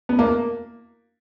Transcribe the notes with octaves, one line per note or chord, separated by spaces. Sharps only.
B3
A#3